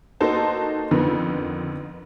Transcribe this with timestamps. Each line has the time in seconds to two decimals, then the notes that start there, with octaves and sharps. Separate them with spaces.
0.21 A#3 D#4 F#4 A4 C5 A5
0.91 F2 D3 D#3 B3